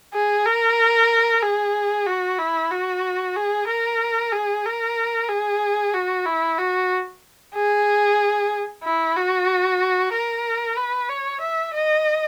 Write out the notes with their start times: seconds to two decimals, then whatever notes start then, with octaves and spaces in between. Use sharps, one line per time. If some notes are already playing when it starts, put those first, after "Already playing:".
0.14 G#4
0.45 A#4
1.42 G#4
2.07 F#4
2.39 E4
2.71 F#4
3.36 G#4
3.68 A#4
4.32 G#4
4.65 A#4
5.29 G#4
5.94 F#4
6.26 E4
6.59 F#4
7.55 G#4
8.84 E4
9.16 F#4
10.13 A#4
10.77 B4
11.09 C#5
11.41 E5
11.74 D#5